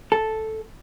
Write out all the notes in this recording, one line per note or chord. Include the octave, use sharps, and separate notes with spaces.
A4